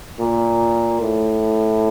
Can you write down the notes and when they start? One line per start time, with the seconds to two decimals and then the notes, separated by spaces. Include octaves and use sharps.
0.19 A#2
1.01 A2